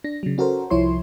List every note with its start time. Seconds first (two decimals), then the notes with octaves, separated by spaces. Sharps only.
0.04 D4 A#6
0.23 C#3 F#3
0.38 C#4 F#4 A4 A#4 C5
0.70 C2 F3 E4 C#5 C6